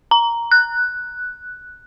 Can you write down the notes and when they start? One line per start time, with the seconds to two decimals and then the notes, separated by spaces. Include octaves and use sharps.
0.11 A#5
0.52 F#6